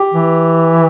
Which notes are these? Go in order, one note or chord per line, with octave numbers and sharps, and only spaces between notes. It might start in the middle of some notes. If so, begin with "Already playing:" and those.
Already playing: G4
E3